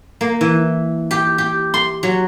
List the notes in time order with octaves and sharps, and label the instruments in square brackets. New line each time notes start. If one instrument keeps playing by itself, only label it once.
[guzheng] A#3
E3
G4
G4
C6
F#3